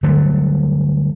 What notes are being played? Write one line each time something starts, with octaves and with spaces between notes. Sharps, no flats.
D3 F#3 G3 A3